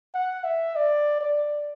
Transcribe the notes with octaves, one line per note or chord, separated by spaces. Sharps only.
F#5
E5
D5
D5